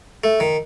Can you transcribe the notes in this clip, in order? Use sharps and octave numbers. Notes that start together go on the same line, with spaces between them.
A3
D#3